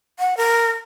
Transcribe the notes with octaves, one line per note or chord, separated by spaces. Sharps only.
F#5
A#4